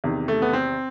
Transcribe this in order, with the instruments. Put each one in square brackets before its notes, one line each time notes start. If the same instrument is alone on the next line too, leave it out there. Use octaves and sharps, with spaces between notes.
[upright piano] E2 C3 D#3
A3
B3
C4